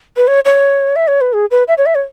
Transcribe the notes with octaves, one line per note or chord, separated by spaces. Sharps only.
B4
C#5
C#5
E5
C#5
B4
G#4
B4
E5
C#5
E5
C#5